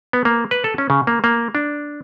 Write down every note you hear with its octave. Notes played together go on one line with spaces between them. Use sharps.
B3
A#3
B4
A4
C#4
C#3
A#3
A#3
D4